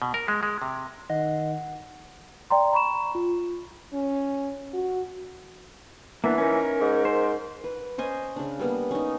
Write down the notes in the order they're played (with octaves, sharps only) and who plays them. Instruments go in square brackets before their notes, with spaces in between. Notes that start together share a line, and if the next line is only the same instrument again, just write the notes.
[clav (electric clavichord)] B2
A#4
G#3
G#3
C3
[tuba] D#3 [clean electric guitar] D#5 [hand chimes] F#5
[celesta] D5 G5 A#5 C6
A#5 B5 C#6 E7
F4
[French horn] C#4
F#4
[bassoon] E3 [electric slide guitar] A#3 B3 D4
[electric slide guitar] C#4 D#4 [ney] A#4
[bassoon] G#2
[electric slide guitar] C5
[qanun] B4
C#4 C5 D#5 G#5
C#3 D4
G3 A#3 B3
C#4 D#4